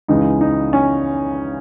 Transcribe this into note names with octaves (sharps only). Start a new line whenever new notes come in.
C#2 C#3 E3 G#3 D#4
D#4
C#4